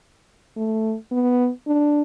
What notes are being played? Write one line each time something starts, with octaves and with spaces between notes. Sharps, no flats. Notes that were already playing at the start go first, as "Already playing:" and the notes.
A3
B3
D4